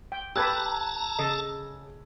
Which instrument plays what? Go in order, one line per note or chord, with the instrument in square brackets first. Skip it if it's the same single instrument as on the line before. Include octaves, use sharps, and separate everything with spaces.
[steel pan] G5
[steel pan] G4 A4 B4 [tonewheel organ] A5 A#5 [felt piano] E6 F#6 G#6
[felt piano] C#3 [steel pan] A4 D#5